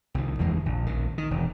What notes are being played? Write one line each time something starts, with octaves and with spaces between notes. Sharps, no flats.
C2 D#3
F#1 E2 D#3 G#3
A#1
A#1 D#3
D#3
E1